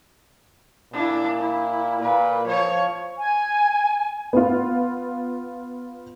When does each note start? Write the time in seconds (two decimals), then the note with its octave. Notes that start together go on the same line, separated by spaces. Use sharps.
0.93 A#2 D4 E4
1.38 E4
2.02 A#2 B4
2.47 F3 C#5
3.18 G#5
4.33 B3 F4